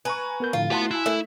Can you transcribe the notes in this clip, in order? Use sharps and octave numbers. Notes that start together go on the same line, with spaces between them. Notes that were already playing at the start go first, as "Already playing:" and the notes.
B4 G#5 A#5 C#6
B3 A#4 G6
A2 D3 F3 F4
A3 E4 F#4 B4 F#5 A5 C6
E4 G#5 E6 F#6
A3 E5